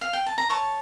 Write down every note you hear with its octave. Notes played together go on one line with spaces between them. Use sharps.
F5
G5
A5
A#5
C#5 A5 C#6